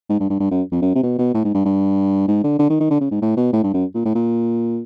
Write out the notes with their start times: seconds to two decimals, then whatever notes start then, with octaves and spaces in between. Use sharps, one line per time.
0.09 G#2
0.20 G2
0.30 G2
0.40 G2
0.51 F#2
0.72 F2
0.82 F#2
0.95 C3
1.03 B2
1.19 B2
1.34 A2
1.45 G#2
1.55 G2
1.66 G2
2.28 G#2
2.44 D3
2.59 D3
2.70 D#3
2.80 D#3
2.90 D3
3.01 C#3
3.11 G#2
3.22 A2
3.37 B2
3.53 A2
3.64 G2
3.74 F#2
3.94 A#2
4.05 A2
4.15 A#2